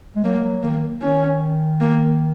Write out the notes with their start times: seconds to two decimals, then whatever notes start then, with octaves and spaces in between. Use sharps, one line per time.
0.16 G#3
0.24 F#3 A#3
0.44 F#3
0.63 D#3 A#3
1.02 D#3 C#4
1.81 A#3